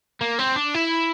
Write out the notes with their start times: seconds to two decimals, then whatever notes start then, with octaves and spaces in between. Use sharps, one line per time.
0.21 A#3
0.39 C4
0.56 D4
0.75 E4